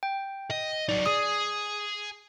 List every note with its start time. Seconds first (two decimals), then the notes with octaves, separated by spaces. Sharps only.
0.03 G5
0.50 D#5
0.89 F#3 D#4 D5
1.06 G#4 D#6